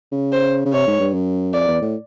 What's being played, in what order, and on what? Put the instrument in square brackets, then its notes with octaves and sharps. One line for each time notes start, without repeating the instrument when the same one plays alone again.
[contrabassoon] C#3
[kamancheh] C5
[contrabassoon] C#3
[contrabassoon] C3 [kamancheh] C#5
[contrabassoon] G#2
G2
F#2
[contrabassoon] F2 [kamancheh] D5
[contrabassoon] E2
A2